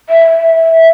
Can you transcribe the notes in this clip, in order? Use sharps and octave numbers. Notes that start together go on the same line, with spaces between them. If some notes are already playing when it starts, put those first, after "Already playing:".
E5